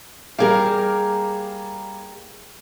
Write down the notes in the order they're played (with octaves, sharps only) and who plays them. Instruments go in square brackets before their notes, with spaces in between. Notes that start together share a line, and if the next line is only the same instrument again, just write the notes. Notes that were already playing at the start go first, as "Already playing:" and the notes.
[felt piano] G3 A#3 F5 [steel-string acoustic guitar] G4 G#4 A#4